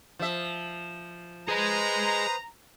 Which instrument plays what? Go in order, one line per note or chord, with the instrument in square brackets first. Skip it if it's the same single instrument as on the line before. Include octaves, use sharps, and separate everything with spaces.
[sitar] F3 E5
[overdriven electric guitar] G#4 D#5 [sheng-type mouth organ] B4 C5 D#6 [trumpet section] A#5